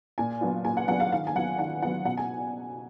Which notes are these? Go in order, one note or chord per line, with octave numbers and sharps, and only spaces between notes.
A#2 G#5
F#3 B3 D4 F4
A#2 G#5
F#5
F#3 B3 D4 F4 F#5
F5
D#3 F5
G#5
F#3 B3 F4 F#5
D#3 F#5
F#3 B3 F4 F#5
B2 F#5
G#5